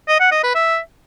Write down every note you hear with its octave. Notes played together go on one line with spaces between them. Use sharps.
D#5
F#5
D#5
B4
E5